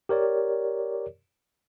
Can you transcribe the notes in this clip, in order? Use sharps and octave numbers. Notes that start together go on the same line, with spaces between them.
G4 A#4 C#5 D5